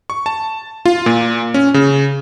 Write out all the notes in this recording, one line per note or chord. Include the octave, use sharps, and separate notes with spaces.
C#6
A5
F4
A#2
C#4
C#3